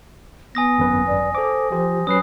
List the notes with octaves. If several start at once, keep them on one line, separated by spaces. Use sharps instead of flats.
B3 G#5 D#6 A#6
G#1 F#2 B4
D5
A4 C5 D6
F3 G4 C5
F#3 C#4 B4 D#6 C7